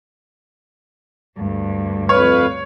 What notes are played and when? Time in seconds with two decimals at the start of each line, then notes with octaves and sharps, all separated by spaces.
1.37 D2 G2
2.09 F2 B4 C#5 F5